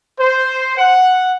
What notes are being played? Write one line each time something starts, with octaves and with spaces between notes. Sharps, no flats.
C5
F#5